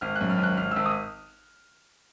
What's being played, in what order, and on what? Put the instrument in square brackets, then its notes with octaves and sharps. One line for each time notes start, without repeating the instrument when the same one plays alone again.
[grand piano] G#1 F6
F#6
F#2
F6
G#1
F#6
G#1 F6
G#1 E6
D#6